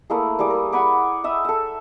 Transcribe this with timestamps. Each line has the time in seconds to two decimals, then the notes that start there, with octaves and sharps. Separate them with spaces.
0.10 A3 A#3 E4 G#4
0.39 G3 E4 G#4 D6
0.50 A#4
0.72 F#5 G#5 B5 D6
1.24 D#5 E5 B5 D#6
1.45 A4 E5